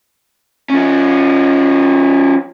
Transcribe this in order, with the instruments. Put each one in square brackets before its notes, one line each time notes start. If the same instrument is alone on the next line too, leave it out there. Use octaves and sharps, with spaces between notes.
[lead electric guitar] F3 C#4